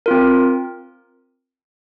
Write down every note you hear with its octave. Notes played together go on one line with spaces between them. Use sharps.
C4 F4 A#4